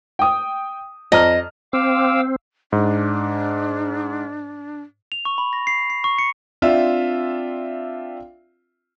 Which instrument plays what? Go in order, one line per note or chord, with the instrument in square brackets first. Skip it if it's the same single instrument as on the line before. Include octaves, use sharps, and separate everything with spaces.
[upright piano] G5 D#6
[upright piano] F2 A#5 F6 [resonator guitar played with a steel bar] D#5
[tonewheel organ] C4 [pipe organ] F5 D6 E6
[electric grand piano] G#2 [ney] D4
[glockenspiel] F7
C#6
B5
A#6
C7
C7
C#6
C#7
[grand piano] C4 D4 F4 E5